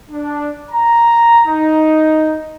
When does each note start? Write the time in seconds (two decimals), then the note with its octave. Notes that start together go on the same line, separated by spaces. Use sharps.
0.11 D4
0.71 A#5
1.46 D#4